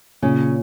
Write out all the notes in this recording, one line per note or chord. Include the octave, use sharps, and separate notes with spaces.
A#2 C#3 C#4